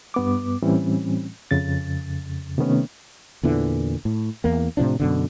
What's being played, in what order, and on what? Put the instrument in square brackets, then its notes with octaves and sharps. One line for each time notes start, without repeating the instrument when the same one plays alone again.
[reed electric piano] G2 B3 D6
A2 E3 G3 C4 C#4
F2 C#3 A6
C3 D#3 A3 B3 C#4
[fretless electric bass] E2 A#2 D3 E3
A2
E2 A#3
A2 C3 F3 D4
F#2 B2 D3